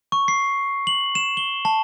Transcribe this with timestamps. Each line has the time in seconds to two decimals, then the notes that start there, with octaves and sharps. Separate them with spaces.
0.12 C#6
0.28 C7
0.87 F#7
1.15 E7
1.37 G7
1.65 A5